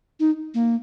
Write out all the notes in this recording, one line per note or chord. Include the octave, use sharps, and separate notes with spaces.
D#4
A#3